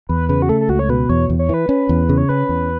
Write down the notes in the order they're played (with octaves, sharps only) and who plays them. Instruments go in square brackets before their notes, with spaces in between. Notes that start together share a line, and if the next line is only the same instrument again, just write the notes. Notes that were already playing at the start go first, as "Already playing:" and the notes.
[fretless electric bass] E2 [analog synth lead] B4
[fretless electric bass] C#3 [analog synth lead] B4
[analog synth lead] F#4
[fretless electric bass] A3 [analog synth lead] A4
[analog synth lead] A4
[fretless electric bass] C#2 [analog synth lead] F#4
[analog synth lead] C#5
[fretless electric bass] B2 [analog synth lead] B4
[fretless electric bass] E2 [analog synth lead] C#5
[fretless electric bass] E2
[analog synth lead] C#5
[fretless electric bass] E3 [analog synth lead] B4
[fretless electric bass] C#4 [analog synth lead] B4
[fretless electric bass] E2
C#3
[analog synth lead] C#5
[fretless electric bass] C#4 [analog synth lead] B4
[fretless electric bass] E2